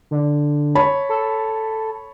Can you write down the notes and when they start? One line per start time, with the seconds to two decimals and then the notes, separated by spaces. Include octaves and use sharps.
0.11 D3
0.75 C#5 A5 B5
1.09 A4